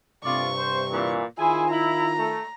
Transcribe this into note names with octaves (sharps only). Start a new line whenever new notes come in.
G2 C3 A3 F4 D5 C#6
C5
A#2 E3
D#3 E4 F4 G#4 C5 G#5
E4 A#5
A3